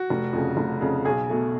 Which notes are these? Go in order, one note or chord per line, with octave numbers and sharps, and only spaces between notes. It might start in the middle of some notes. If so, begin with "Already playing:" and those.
Already playing: F#4
F1
F2 C#3
F1
F2 C#3
B1 G#4
B2 A3